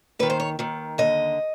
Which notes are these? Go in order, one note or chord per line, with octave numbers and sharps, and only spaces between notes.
D#2 D#3 B4
C5
C#5
D#2 D#3
D#2 D3 D#5